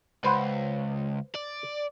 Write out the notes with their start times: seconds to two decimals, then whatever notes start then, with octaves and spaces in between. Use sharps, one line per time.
0.24 C#2 B4 C5 F#5
1.35 D5